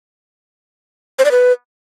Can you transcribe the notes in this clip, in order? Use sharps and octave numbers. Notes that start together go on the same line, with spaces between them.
C5
D5
B4